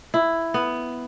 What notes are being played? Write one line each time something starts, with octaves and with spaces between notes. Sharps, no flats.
E4
B3